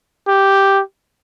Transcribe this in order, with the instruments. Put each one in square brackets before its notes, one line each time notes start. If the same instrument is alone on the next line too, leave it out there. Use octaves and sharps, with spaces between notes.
[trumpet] G4